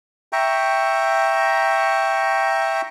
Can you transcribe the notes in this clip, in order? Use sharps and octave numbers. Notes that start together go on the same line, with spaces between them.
E5 G5 A#5 C#6